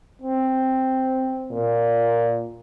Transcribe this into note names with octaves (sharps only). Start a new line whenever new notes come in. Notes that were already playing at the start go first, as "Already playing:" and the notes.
C4
A#2